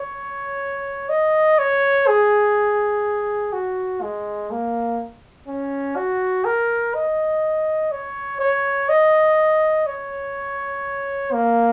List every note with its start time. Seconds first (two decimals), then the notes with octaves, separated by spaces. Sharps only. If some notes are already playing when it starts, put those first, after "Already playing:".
Already playing: C#5
1.09 D#5
1.59 C#5
2.07 G#4
3.53 F#4
4.02 G#3
4.51 A#3
5.48 C#4
5.96 F#4
6.45 A#4
6.95 D#5
7.92 C#5
8.40 C#5
8.89 D#5
9.87 C#5
11.33 A#3